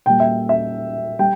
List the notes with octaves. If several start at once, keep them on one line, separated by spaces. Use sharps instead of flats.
A#2 G3 G5
E5
E5
G3 G5